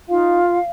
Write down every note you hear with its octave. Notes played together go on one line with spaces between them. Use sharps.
D#4 F4 F5